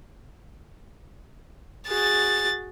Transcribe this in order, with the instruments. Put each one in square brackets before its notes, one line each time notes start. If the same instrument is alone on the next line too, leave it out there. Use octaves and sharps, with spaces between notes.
[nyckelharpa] F#4 G#4 [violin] A6